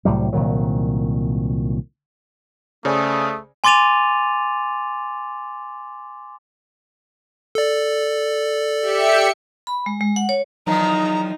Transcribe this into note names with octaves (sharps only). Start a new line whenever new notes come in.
C2 A2 F#3 G3
C2 A#2 D#3 F#3
C#3 A3 C#4 G#4 C5 D5 D#6
G#5 C6 D6 A6 D#7 F7
A4 D5
G4 E5 C#7
B5
G#3
G#3
F#5
C#5
E2 D#3 F3 F#3 D#4 A#5